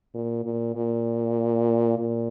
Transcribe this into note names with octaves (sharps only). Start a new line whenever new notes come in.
A#2
A#2
A#2
A#2